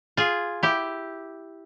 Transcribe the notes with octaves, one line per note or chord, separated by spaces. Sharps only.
F4 G#4
E4 G4